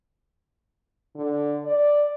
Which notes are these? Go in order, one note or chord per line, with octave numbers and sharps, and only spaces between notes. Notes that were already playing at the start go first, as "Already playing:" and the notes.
D3
D5